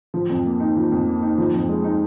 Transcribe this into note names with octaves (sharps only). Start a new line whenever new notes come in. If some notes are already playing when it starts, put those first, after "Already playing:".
F3
F2
A#3
D#4
F3
F2
A#3
D#4
F3
F2
G#3
D#4